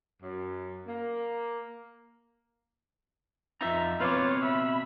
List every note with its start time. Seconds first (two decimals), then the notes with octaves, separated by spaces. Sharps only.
0.22 F#2
0.88 A#3
3.61 F2 D#4 F4 E5 A#5
4.00 B2 C4 F4 B4 C#5 F5 D6
4.42 E5 B5